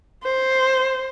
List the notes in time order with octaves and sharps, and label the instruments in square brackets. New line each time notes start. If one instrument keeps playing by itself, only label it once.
[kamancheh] C5